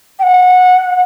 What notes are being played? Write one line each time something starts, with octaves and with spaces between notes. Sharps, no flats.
G5
F#5